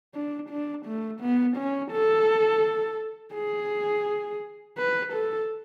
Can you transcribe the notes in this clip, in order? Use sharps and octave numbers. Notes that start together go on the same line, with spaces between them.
D4
D4
A3
B3
C#4
A4
G#4
B4
A4